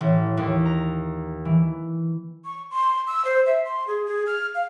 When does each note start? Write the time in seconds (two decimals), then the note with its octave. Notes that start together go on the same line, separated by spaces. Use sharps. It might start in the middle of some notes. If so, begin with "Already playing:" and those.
0.01 A1
0.37 D#2
0.65 A#5
1.45 E3
2.45 C#6
2.71 C6
3.07 E6
3.25 C5
3.46 E5
3.65 C6
3.87 G#4
4.06 G#4
4.27 F6
4.55 F5